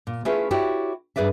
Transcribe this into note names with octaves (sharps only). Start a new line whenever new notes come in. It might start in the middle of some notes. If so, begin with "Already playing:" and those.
A#2
A3 C#4 E4 F4 G#4 B4
E4 F#4 G4 C#5 D5
G2 G#4 B4 D5 E5